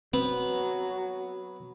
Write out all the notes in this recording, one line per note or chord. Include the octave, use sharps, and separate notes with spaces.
F#3 B3 C4